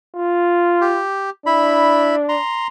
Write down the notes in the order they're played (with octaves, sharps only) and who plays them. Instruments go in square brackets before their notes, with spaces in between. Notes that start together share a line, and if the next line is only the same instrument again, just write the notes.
[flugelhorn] F4
[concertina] G4
[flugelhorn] D4 [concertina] E4 B5
[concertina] A#5 C6